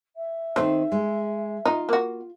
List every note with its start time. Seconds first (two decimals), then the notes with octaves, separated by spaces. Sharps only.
0.16 E5
0.56 D#3 A3 C4 C5
0.92 G#3
1.65 D#4 F4
1.89 A#3 F#4